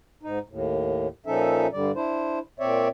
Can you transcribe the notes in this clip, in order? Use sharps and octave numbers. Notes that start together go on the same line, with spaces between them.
G#2 D#4
D#2 A2
A#2 F3 C#4 D#4 A4 E5
G2 D3 G3 D5
D4 E4 C5
A#2 C4 C#5 D5 E5